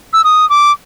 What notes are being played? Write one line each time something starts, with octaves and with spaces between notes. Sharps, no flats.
E6
D#6
D6